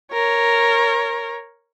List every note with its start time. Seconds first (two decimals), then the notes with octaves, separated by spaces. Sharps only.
0.13 A#4 C#5